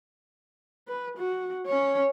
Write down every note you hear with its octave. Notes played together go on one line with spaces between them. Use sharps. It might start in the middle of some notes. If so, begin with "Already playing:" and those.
B4
F#4
C#4 C#5